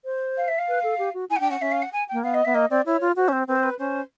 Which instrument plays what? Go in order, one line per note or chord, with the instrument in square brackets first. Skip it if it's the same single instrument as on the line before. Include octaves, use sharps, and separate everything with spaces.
[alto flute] C5
[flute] F5
E5
F5
[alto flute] B4
A4
G4
F#4
[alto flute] E4 [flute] G#5
[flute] F#5
[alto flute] D4 [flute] G5
[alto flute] C#4 [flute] F#5
[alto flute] C#4 [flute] E5
[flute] F5
F#5
G#5
[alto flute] A#3 [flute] G5
[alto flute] B3 [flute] F5
[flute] D#5
[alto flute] B3 [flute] E5
[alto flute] A#3 [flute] D#5
[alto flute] C4 [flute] D5
[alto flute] E4 [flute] C#5
[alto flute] F4
[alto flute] F#4 [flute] C5
[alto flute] C#4
C4
[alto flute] C4 [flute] B4
[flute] C5
B4
[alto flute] C#4 [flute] C5